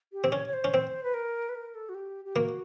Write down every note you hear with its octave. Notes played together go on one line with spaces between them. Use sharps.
G4
C4
C#4 C#5
C#5
C5
C#4
C4
B4
A#4
B4
A#4
A4
F#4
G4
G4
A#3 F#4